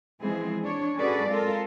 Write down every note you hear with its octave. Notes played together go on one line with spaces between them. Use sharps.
E3 F3 G#3 C4 G#4
D4 C#5
C#4 F#4 G#4 A4 B4 D5
G#3 C4 F4 A4 A#4